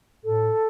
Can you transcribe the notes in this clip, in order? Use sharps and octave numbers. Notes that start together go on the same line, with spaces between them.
A2 A4